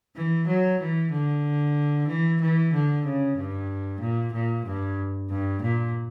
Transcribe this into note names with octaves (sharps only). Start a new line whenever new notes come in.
E3
F#3
E3
D3
E3
E3
D3
C#3
G2
A#2
A#2
G2
G2
A#2